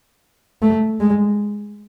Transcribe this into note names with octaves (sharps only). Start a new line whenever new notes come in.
A3
G#3